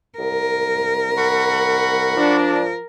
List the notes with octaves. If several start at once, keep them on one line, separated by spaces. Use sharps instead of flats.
C2 A#4
F#5 B5 C#6
F3 D4